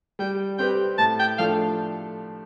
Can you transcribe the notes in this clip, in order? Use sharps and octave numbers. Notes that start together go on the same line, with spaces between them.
G3 G5
C4 G4 B4 G5
A2 A5
G5
F3 A3 D4 A4 F5